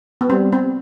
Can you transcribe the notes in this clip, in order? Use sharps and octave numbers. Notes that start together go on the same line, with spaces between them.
B3
G3 C4
C4